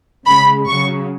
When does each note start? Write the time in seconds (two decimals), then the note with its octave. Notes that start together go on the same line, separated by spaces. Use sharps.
0.26 C#3 G#3 B5
0.68 C#3 F#3 C#6